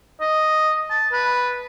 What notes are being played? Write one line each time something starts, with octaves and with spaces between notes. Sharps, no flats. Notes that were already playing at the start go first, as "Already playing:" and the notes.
D#5
A5
B4